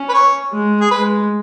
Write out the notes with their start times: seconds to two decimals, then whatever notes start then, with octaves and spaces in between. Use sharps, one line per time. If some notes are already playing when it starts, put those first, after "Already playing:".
Already playing: C#4
0.09 B4
0.14 C#5
0.52 G#3
0.81 G#4
0.90 G#3 B4